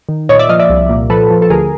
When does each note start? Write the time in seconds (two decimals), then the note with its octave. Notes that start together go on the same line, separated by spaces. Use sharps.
0.09 D#3
0.29 A#2 C#5 D#5
0.39 D5 E5
0.49 F3 D#5 F5
0.60 D5 E5
0.70 C2
0.89 A#2
1.10 F3 A4 B4
1.30 F3
1.42 A4
1.50 D2 G#4 A#4